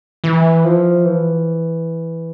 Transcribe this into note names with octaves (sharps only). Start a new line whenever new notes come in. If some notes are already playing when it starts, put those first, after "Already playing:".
E3
F3
E3